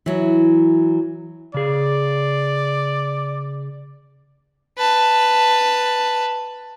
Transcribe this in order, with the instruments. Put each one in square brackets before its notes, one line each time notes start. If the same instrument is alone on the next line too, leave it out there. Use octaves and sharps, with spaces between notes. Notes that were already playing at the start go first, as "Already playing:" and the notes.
[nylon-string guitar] E3 F#3
[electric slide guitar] C#3 G#4 [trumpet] D5
[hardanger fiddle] B4 A5